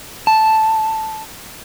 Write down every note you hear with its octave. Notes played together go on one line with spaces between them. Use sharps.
A5